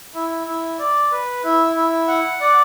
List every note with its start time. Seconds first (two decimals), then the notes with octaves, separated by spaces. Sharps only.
0.15 E4
0.47 E4
0.79 D5
1.12 B4
1.44 E4
1.76 E4
2.08 F#5
2.41 D5